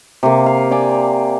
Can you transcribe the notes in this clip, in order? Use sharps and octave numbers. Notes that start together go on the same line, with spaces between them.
C3 A#3
F5
D5 F5 G5 G#5